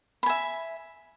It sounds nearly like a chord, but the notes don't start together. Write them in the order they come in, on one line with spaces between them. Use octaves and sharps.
B5 G#5 E5